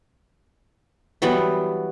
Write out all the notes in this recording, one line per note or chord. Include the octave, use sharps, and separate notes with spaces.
E3 F#3 G3 B3